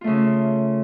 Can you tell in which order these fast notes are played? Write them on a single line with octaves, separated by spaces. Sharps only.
F4 A3 C#3